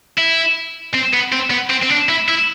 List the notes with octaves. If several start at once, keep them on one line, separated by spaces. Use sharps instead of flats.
E4
C4
B3
C4
B3
C4
C4
D4
E4
E4